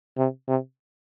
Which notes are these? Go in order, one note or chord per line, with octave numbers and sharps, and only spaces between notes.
C3
C3